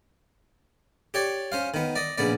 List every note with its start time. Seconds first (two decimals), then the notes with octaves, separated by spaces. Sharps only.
1.14 G4 C#5 D5
1.52 C#4 C5 F5
1.74 D#3 B3
1.96 D5 D#5
2.18 A#1 C#3 B3 D5